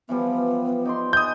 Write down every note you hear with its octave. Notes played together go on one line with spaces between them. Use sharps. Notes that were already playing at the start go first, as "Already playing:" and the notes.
E3 F3 G3 B3
D#4 D5 C6
B3 D#4 G#4 D#6 G6